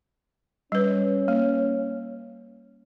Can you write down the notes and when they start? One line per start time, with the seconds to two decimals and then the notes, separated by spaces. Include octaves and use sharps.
0.72 G3 C#4 B4
1.28 A#3